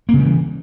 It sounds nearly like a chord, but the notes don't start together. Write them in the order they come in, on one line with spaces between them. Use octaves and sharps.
A#3 C#3 G3 E3